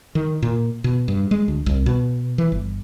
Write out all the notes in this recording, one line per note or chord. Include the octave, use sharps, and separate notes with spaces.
D#3
A#2
B2
G2
G#3
D2
C2
B2
E3
G1